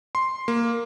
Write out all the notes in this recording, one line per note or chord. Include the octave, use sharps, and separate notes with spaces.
C6
A#3